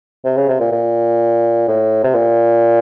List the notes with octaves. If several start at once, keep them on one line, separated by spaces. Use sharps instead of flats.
C3
C#3
C3
A#2
A#2
A2
C3
A#2